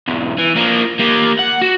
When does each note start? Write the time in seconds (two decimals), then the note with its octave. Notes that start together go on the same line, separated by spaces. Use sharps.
0.08 B1 E2
0.39 E3
0.56 F3 A#3
0.99 A#3 G4
1.39 F#5
1.62 F#4